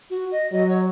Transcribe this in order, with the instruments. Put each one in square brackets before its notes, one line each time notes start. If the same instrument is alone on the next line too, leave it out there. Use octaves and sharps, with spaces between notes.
[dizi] F#4
D#5
[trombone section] F#3 [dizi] D#5
[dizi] C#5